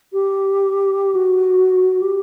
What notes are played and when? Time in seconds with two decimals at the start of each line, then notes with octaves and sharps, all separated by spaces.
0.13 G4
1.15 F#4
2.01 G4